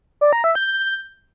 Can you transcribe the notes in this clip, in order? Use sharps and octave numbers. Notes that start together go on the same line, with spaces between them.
D5
A#5
E5
G6